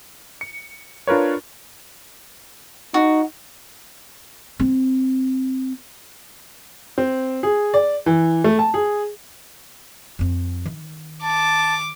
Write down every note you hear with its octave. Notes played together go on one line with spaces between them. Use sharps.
C#7
D4 F4 A#4 B4 C#5
D#4 F#4
C4
C4
G#4
D5
E3
A3
A5
G#4
F2 C4
D#3
A5 D6